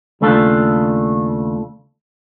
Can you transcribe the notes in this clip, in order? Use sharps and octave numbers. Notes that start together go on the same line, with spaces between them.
D#2 C#3 A3 D4 F4 A4